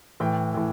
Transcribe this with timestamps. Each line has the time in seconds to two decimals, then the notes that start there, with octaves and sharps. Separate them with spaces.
0.20 A2 E3 G5
0.54 A2 E3